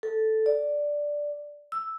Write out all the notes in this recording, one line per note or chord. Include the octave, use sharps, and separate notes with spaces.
A4
D5
E6